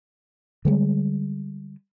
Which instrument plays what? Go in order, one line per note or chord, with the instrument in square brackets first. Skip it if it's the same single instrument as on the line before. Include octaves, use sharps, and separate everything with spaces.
[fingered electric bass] D3 G3 G#3